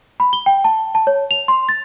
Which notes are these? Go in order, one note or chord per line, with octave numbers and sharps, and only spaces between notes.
B5
G7
G5
A5
A5
C#5
F7
C6
A6